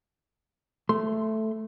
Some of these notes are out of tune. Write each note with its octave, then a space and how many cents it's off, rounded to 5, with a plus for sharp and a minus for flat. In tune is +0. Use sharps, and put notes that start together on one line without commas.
A3 +0 C6 +0